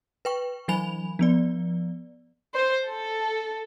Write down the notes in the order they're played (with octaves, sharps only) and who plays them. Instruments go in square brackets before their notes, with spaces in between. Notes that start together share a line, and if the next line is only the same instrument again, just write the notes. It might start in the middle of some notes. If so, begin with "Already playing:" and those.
[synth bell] B4 G5 C#6
E3 F#3 G#5 B5 F7
F3 B3 D5
[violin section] C5
A4